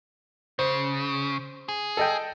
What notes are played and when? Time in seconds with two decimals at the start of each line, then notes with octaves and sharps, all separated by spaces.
0.59 C#3 C5
1.69 G#4
1.97 A4 D#5 G5